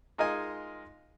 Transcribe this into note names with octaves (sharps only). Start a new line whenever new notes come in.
G#3 D#4 F4 A#4 D#5 G#5